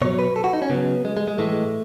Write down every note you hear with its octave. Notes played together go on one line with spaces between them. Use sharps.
B2 F#3 C#5
B4
A4
F#4
D#4
C#4
C#3 F#3 B3
G#3
G#3
G#3
A2 E3 G#3 A3